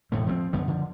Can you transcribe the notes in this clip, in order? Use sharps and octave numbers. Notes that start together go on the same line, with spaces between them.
E1 A2 D3 A3
F3 G3 C4
F#2 D3 B3
D3 F3